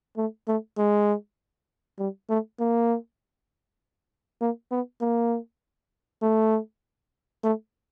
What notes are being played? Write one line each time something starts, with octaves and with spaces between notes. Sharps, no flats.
A3
A3
G#3
G3
A3
A#3
A#3
B3
A#3
A3
A3